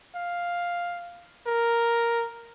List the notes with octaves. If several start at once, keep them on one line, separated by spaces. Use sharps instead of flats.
F5
A#4